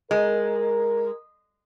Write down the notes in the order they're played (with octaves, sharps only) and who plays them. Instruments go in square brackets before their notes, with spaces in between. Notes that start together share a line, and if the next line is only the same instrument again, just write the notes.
[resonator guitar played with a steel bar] G#3 [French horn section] A#4